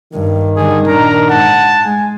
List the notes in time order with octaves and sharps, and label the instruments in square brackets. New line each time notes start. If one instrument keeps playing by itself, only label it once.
[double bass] G2 [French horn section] D#3
[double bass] D3 G3 [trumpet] G#4
[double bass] A#2 D4 [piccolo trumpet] A#4 [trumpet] A#5
[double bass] G#2 [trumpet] F#5 [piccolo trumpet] A5
[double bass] G#3 [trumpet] G#5